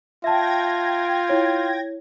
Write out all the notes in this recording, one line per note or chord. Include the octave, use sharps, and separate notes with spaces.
F4 E5 G5 A5 G#6 A#6
E4 C#5